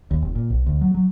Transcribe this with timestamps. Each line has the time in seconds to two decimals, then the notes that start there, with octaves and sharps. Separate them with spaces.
0.11 D#2
0.22 F1
0.35 A#2
0.50 B1
0.67 D2
0.81 F#3
0.95 F#3